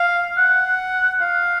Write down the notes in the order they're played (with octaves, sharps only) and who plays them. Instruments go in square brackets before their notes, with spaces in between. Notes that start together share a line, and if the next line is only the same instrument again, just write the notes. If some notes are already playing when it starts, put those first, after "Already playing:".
Already playing: [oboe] F5
F#5
F5